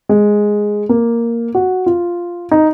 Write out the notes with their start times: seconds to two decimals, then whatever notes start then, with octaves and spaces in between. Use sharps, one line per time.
0.09 G#3
0.89 A#3
1.55 F#4
1.86 F4
2.51 D#4